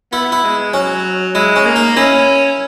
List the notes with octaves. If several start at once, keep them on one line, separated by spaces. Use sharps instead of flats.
B3 E4
E4
G#3
F#3 C#4
G#3 E4
C#4
A#3
D#4
C#4 E4